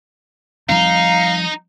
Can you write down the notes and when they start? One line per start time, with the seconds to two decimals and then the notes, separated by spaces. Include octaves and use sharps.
0.69 F3 G3 C4 D#4 F5 A#5